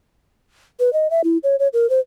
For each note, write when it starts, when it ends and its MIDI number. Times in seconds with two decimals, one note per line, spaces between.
0.80 0.93 71
0.93 1.10 75
1.11 1.21 76
1.24 1.38 64
1.44 1.56 73
1.59 1.68 73
1.73 1.89 70
1.90 2.00 72